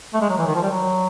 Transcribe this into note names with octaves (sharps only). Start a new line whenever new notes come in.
A3
G#3
F#3
E3
D#3
F3
G3
F#3